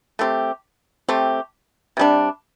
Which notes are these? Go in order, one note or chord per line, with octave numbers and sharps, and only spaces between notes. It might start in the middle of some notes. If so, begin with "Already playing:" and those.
A3 C4 G4
A3 C4 G4
C3 G3 D4